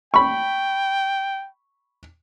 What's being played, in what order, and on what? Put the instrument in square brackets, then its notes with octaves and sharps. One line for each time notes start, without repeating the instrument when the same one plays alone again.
[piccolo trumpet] G5 [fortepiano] B5 C#6